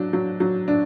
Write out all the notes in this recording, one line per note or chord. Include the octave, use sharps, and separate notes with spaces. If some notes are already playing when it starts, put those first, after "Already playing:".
Already playing: F#3 D4
F#3
F#3
D4